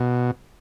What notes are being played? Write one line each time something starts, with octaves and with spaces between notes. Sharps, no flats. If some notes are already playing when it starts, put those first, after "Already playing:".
Already playing: B2